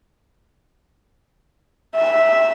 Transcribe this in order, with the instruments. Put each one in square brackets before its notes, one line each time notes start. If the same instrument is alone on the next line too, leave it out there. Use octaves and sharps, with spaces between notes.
[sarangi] E5